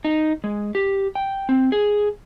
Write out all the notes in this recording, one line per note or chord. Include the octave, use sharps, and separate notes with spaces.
D#4
G#3
G4
G5
C4
G#4